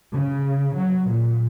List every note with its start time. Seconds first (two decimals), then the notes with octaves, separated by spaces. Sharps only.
0.12 C#3
0.75 F#3
1.08 A#2